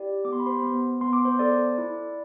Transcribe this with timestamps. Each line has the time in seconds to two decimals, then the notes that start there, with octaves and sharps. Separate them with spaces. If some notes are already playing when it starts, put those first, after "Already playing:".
Already playing: E4 G4 D5
0.25 B3 D6
0.32 C6
0.40 B5
0.46 C5 C6
0.63 B3
1.01 B3 C6
1.13 D6
1.25 C5 C6
1.39 A4 D5 D6
1.78 E4